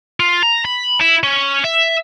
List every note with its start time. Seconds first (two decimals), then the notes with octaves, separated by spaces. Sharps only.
0.20 F4
0.43 A#5
0.65 B5
1.00 E4
1.23 C#4
1.64 E5